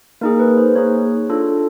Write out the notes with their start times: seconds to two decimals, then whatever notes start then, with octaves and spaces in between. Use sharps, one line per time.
0.21 A#3 D#4 G#4 A#4
0.39 B4
0.57 C5
0.76 A#3 D#4 G#4 C#5
1.30 D4 F4 A4